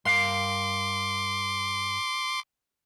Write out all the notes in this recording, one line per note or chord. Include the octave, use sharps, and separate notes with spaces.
G2 A#4 F5 C6 D6